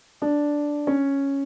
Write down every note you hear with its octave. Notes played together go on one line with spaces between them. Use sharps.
D4
C#4